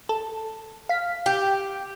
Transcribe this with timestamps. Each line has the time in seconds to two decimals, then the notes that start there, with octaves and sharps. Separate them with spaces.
0.09 A4
0.89 F5 B6
1.26 G4 G5